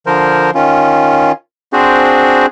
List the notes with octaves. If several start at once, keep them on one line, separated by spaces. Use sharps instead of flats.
D3 F3 A#4 C5
D#3 C#4 F4
C4 D4 F#4 G#4 C5